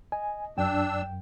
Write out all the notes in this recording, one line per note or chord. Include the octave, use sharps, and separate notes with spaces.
D#5 G#5
F#2 D4 G5 E6